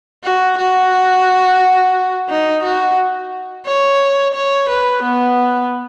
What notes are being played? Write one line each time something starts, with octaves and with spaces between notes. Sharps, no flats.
F#4
F#4
D#4
F#4
C#5
C#5
B4
B3